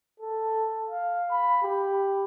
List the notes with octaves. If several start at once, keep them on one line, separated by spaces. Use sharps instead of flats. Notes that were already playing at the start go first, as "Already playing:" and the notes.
A4
F5
B5
G4